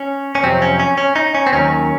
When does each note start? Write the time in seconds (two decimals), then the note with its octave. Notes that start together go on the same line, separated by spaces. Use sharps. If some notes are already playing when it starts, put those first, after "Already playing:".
Already playing: C#4
0.35 C#4
0.43 F2 C3 F#3 C4
0.62 C#4
0.80 C#4
0.98 C#4
1.16 D#4
1.35 C#4
1.47 C4
1.52 D#2 D#3 F#3 C#4